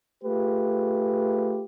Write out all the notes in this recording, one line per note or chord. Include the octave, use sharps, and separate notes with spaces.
A3 F4 G4 G#4 B4